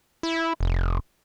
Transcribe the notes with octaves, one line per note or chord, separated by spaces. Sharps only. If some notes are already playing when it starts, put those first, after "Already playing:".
E4
F1